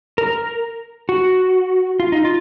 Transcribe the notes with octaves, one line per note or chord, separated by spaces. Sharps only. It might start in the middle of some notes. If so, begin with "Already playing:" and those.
A#4
F#4
F4
D#4
F4